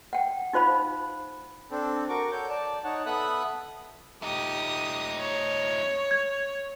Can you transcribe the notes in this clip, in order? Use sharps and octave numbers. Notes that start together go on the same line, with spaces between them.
F#5 G5
D#4 F4 C5 F5 B5
C4 D4 A4
F#4 A#4 C#6 D6
A4 C#5 G6
D5 A5
D#4 C#5 F#5 A5
B3 A4 E5 B5 D#6 F#6
A3 D#4 G4 D#6
C#5
G#6